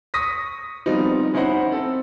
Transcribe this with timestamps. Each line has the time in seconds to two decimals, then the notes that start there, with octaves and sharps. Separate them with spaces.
0.14 C#6 D#6 A#6 B6
0.86 F3 G3 B3 C4 D#4
1.34 C#4 D#4 E4 C5 F#5 B5
1.72 C4 A4